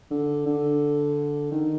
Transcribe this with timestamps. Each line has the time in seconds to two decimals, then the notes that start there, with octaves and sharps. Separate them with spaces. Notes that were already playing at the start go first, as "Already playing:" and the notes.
0.11 D3
0.46 D3
1.52 D#3